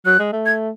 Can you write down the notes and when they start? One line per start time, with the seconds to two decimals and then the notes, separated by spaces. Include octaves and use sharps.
0.05 F#3 F#6
0.19 G#3
0.32 A3
0.46 G#6